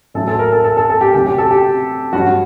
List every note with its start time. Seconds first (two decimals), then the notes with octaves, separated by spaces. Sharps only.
0.14 A1 A2 F#3 A4
0.27 A4
0.39 A#4
0.52 A4
0.64 A4
0.77 A4
0.90 A4
1.01 G4
1.14 D2 C3 F#3 G4
1.26 G4
1.38 A4
1.51 G4
2.13 A1 G2 F#3 F#4